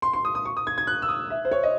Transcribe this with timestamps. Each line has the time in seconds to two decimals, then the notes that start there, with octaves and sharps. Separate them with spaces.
0.02 C6
0.13 C6
0.25 D#6
0.35 D#6
0.45 C#6
0.57 D#6
0.67 G#6
0.78 G#6
0.87 F#6
1.02 E6
1.08 D#6
1.30 E5
1.45 C5
1.51 C#5
1.63 D#5